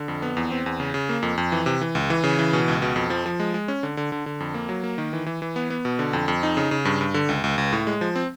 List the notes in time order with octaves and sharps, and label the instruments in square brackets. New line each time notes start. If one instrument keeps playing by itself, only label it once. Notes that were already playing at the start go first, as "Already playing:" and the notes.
Already playing: [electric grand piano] D3
F2
B3
E2
C4
E2
C#3
C#3
A#3
F2
F2
E3
C3
E3
C#2
E3
C#3
E3
B2
C#2
B2
F2
F3
F3
G#3
G#3
C#4
D3
D3
D3
D3
F2
A#3
F#3
A#3
D#3
E3
E3
E3
B3
B3
B2
D3
F2
F2
D#4
C#3
C#3
G2
G2
D3
C#2
C#2
C#2
A2
G#3
F3
C4